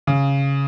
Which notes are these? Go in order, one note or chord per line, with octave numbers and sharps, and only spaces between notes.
C#3